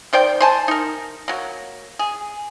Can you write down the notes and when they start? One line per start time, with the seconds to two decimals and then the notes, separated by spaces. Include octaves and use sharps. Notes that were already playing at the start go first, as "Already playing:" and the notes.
0.13 D#3 C5 D5 G5
0.40 C5 G#5 A5
0.68 D#4 A#4
1.28 F#3 A#3
1.99 G#4